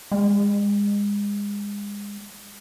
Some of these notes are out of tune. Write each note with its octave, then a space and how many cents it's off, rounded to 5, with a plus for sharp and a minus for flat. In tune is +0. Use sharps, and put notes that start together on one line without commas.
G#3 -30